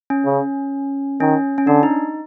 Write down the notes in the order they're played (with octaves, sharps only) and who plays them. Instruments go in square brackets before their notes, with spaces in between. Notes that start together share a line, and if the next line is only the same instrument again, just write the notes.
[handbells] C#4
[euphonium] C#3
[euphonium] D#3 [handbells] C#4
[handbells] C#4
[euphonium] D3 [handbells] D4
[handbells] D#4